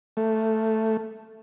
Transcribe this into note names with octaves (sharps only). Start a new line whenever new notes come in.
A3